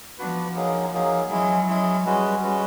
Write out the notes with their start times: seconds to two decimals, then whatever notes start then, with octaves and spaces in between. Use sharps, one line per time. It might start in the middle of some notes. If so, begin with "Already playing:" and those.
0.18 F3 B3 D4 F#4 B4
0.56 F#3 A#3 D#4 G#4
0.93 F#3 A#3 D#4 G#4
1.30 F#3 G#3 C#4 E4 G#4
1.68 G#3 C#4 E4 G#4
2.05 G3 G#3 C#4 F#4 B4
2.43 G#3 C#4 F#4 B4